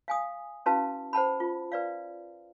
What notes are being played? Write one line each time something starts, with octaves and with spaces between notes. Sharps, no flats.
F5 G#5 D#6
C#4 E4 F#4 B4 F5 A5
C5 F#5 A5 B5
F4
B4 D5 F5